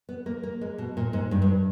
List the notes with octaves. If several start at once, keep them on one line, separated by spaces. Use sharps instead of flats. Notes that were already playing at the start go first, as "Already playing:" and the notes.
B3
A#3
A#3
G#3
B2
A#2
G#2
G2
G2